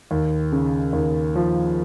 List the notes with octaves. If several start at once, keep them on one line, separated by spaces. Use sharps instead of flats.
D#2
C#3
D#2
F3